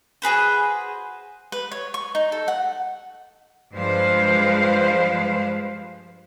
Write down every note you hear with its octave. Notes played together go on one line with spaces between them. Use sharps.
F#4 G#4 B4 C5
B4
C#5
C#6
D#4
A4
F#5
G2 F3 G#3 B4 C5 F5